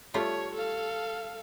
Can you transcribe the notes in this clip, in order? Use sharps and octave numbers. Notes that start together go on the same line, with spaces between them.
G3 A3 F4 C#5
A4 F5